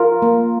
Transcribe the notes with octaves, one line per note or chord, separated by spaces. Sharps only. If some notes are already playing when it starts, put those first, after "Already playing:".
Already playing: F4 A#4
A#3